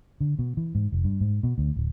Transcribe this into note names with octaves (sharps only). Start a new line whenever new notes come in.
D3
B2
E3
G#2
F1
G2
G#2
B2
D2
D1